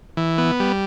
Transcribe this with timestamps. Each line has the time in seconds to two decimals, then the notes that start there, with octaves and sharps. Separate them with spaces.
0.17 E3
0.38 B3
0.60 G3